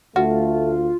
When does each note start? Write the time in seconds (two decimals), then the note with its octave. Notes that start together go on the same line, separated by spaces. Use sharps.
0.16 D2 A3 F4 F#4